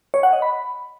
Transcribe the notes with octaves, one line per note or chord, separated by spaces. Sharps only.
C#5
F#5
D#5
B5